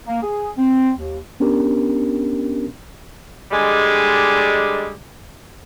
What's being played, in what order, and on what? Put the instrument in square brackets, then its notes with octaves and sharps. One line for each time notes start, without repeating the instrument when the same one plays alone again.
[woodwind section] A#3
G#4
C4
D#2
[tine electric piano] B3 C#4 D4 G4 A#4
[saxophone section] D3 G3 G#3